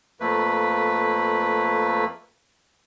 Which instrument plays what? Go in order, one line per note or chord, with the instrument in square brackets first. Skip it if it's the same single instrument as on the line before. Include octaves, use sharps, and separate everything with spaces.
[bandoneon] F2 A3 A#3 B4